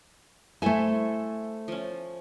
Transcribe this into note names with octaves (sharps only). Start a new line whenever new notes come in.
A3 E4 A4 C5 G#5
F3 C#4